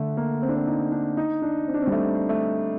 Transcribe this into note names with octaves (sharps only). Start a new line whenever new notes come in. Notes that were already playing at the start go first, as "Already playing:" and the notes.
Already playing: D3 A3
A#3
C4
D4
C4
D#4
D4
D#4
D4
C4
D4
C4
G3
A3
A3